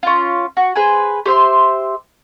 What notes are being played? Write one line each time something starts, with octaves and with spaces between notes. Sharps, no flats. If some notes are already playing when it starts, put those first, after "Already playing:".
C#4 F4
F#4
G#4 B4 C5 G#5
G4 C5 E5 C6